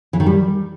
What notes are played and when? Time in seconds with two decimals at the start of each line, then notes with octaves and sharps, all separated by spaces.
0.13 E3
0.20 D#3
0.26 G3